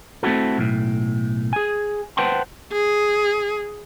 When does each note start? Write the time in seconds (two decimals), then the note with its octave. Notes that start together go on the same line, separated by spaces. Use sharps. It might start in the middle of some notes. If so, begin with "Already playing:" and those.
0.23 A3 C4 E4 F#4 A4
0.58 B1 A2
1.53 G#4 G#5
2.17 B4 C5 F#5 G5 A5 C6
2.72 G#4